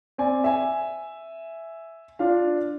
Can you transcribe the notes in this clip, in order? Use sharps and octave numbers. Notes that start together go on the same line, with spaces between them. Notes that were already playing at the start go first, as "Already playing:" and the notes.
C4 D5 G#5
E5 G#5
D4 F4 F5